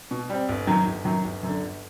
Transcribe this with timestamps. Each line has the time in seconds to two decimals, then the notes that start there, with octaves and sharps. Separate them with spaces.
0.11 B2
0.30 G3 C4
0.49 G1
0.67 F#2 D#3 F#3
0.87 G1
1.05 F#2 D#3 F#3
1.24 G1
1.43 F#2 D3
1.61 G1